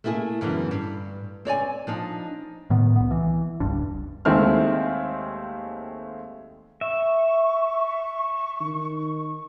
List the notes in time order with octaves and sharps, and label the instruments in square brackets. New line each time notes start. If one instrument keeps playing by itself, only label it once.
[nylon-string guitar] A3 A#3 E4 G4 G#4
F#2 D3 E3 G3 B3
G2
C4 C#5 D5 G#5
F3 D4 D#4
[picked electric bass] A2 D#3 B3
C2 B3
E3
F1 C#2 G2 D4
[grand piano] D#2 D#3 G#3 A3 C4 F6
[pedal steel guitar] E5 [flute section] C#6
[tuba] D#3